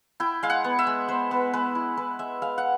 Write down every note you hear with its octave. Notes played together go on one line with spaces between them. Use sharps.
E4 G5
G#3 F5
F#5
B3
E5
G#3
B3 C5
B3
G#3 B4
E4
E4 B4
G#3 E5
G#3 F5
F#5